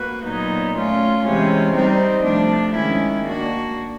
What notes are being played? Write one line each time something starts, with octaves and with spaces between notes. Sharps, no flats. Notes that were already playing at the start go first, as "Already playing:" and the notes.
Already playing: A#3 F#4 B4
A#2 F#3 B3 D#4
A3 C#4 F4
C3 E3 G#3 C#4
G3 C4 D#4
C3 F3 A3 D4
D#3 G#3 C#4 E4
A#3 D4 F#4